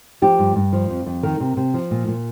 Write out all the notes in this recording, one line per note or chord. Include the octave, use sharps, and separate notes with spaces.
F3 G4
G2
G2
F3
F2
F2
D#3 A#4
C3
C3
F3
A#2
A#2